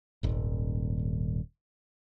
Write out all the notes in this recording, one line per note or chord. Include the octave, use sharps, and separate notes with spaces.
D#1 G#1